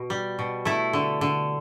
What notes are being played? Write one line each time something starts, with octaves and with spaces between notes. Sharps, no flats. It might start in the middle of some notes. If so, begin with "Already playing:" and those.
Already playing: B2
G3
B2
A3 E4
D3
D3